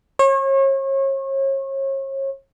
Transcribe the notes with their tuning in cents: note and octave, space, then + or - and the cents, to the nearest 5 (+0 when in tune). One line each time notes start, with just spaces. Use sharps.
C#5 -35